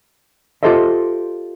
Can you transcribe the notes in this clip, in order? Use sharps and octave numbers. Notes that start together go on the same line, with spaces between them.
F4 G4 A4 C5 D#5 E5